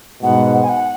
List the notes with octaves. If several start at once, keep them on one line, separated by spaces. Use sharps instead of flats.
G#2 B2 F#5
G#5
F#5